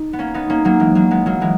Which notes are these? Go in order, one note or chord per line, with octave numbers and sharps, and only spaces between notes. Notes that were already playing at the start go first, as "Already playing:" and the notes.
Already playing: D#4
B3
A#3 C#4
B3 D#4
A#3 C#4
F#3 A#3
E3 G#3
F#3 A#3
G#3 B3
F#3 A#3
E3 G#3